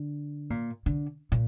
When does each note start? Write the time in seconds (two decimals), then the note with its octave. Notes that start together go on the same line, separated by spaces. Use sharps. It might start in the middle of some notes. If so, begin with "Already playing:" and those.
Already playing: D3
0.50 A#2
0.86 D3
1.32 A#2